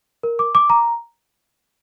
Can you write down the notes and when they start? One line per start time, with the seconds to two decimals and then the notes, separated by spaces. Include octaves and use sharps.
0.23 A#4
0.39 D6
0.55 D6
0.70 A#5